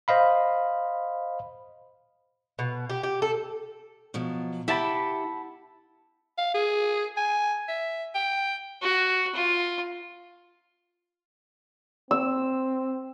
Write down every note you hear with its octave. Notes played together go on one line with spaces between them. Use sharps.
C5 D#5 F5 B5
B2
G4
G4
A4
B2 F3 F#3
E4 G4 E5 F#5 A5 B5
F5
G#4
G#5
E5
G5
F#4
F4
C4 E6